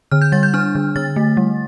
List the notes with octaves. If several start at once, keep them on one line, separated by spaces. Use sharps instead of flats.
D3 F6
G6
G3 A6
G6
D4 F6
D3
D3 A6
A3
G3